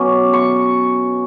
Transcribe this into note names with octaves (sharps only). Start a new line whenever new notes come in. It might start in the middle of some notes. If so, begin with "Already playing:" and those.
Already playing: B2 F#3 C#4 D6
C#6